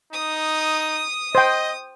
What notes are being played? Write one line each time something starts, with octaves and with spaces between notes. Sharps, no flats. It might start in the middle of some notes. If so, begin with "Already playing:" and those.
D#4 D#6
C5 D#5 G5